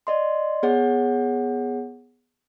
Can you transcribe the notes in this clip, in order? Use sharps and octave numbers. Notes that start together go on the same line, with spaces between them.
D5 D#5 C6
B3 G#4 C#5 F#5